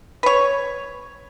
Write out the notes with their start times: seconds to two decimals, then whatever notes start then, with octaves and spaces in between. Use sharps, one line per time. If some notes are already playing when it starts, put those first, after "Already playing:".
0.23 B4 C#5